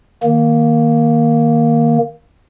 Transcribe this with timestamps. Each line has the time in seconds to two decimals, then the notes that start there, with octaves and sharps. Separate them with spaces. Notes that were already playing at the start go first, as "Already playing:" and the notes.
0.23 D#3 A#3